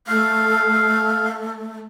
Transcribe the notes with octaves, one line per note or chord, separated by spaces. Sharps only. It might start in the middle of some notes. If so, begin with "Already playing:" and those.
A3 F5